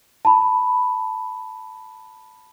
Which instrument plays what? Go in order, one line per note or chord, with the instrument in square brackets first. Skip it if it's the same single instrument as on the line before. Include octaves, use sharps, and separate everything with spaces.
[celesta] A5 B5